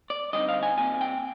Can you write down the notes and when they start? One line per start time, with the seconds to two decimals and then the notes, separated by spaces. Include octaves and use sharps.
0.10 D5
0.33 D3 G3 C4 D#4 D#5
0.48 F5
0.63 G#5
0.77 A#2 G3 C4 G#5
1.01 G5